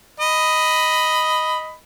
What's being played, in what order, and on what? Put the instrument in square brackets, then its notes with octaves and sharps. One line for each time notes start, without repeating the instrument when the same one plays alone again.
[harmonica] D#5 B5